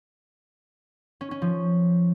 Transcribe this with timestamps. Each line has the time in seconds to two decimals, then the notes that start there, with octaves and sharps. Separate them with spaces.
1.21 C#4
1.31 C#4
1.42 F3